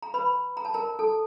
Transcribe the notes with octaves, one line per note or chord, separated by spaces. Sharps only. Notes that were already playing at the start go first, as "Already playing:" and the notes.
A#5
B4 B5
A#5
A5
A#4 A#5
A4 A5